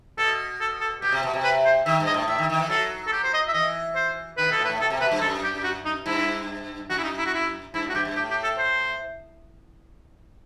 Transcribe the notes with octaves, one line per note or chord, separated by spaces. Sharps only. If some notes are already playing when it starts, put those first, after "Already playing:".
B2 A4
A4
A4
B2 G4
C3
B2
C3
B4
C5
D#3 E5
G2
D#5
A2
A2 E5
D#3
D#3
E3
F#3 A4
A4
G4
C5
D#5
E5
E3 D#5
C5
D#3 B4
B2 A4
A2
B4
A2
B2 A4
C3
B2 B4
G2
F#2 A4
G4
G4
F#4
D#4
G2 E4
F#2 F#4
E4
D#4
E4
F#4
E4
G2 E4
A2
F#4
G2 G4
G2
A2 G4
G4
A4
C5